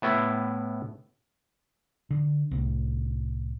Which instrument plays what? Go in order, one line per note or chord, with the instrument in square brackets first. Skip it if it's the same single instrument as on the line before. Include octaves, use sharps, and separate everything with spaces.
[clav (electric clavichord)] A2 B3 E4
[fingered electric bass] D3
C2 A2